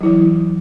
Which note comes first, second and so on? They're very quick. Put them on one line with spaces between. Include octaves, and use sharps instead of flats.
F#3 E4 E3